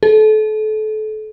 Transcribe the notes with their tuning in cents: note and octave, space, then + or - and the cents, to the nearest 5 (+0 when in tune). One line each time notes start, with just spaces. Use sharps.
A4 -30